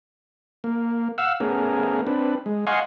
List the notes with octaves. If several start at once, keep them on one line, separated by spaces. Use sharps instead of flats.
A#3
F5 F#5 E6
A3 B3 C#4 G#4 A#4
C4 D4 B4
G#3
D#5 F5 F#5 G#5 C6 C#6